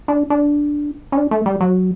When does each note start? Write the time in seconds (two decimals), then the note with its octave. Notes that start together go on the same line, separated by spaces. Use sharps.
0.08 D4
0.30 D4
1.12 C#4
1.17 D4
1.31 A3
1.46 G3
1.61 F#3